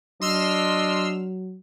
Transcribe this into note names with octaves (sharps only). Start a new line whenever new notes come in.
F#3 D4 D#5 C6 E6 F6